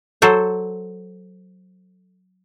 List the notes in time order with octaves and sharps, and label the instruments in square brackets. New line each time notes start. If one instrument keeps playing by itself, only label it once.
[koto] F#3 A4 C5